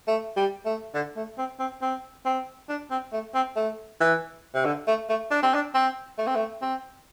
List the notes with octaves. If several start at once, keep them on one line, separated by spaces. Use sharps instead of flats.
A3
G3
A3
D3
A3
C4
C4
C4
C4
D4
C4
A3
C4
A3
E3
C3
D3
A3
A3
D4
C4
D4
C4
A3
C4
A3
C4